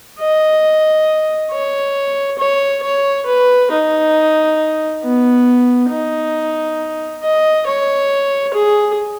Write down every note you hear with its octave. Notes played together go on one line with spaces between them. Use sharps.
D#5
C#5
C#5
C#5
B4
D#4
B3
D#4
D#5
C#5
G#4